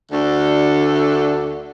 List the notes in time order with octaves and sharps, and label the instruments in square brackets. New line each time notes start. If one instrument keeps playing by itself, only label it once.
[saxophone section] D2 D3 A3 D4 A4